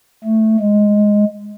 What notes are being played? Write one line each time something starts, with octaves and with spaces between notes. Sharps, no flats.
A3
G#3